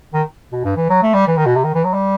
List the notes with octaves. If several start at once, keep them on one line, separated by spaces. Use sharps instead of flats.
D#3
B2
G2
E3
F#3
A3
G3
E3
D#3
B2
C3
D#3
E3
F#3
G3